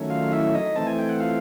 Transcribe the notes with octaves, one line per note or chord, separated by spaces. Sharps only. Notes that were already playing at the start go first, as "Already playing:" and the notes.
Already playing: D#3 F#3 A3 C#4
F4 F5
E4 E5
D#4 D#5
E3 A3 C4 A5
G#5
G5
F#5
F4 F5